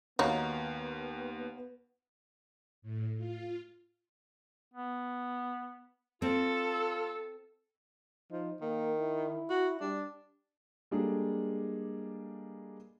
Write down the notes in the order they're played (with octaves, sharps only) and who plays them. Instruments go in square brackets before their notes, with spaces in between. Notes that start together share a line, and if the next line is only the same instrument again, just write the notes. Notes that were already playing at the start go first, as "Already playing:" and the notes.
[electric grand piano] D#2 [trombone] B3 [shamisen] D#4 F#4 [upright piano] C#5 F5 A#5
[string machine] A2
F4
[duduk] B3
[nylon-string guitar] C4 [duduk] F4 [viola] A4
[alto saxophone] F3 [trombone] D#4
[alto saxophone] D#3 [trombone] A#3
[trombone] E4
[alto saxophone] F#4
[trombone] G3 [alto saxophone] D4
[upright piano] G3 G#3 A#3 D4 G#4 A4